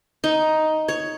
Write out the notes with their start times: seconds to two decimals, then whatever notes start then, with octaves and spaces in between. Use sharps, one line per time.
0.24 D#4
0.88 C#5